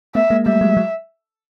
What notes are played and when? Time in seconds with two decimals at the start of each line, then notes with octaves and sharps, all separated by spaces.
0.15 A3 B3 E5
0.30 G#3 A#3
0.46 G3 A3 E5
0.61 F#3 G#3
0.77 F#3 G#3